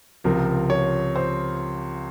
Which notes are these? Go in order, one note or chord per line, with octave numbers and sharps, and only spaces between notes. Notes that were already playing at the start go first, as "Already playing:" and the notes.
C#2 C3 F3 A#4
C#5
C5